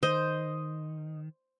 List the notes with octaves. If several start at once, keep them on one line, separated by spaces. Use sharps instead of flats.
D#3 C5 D#5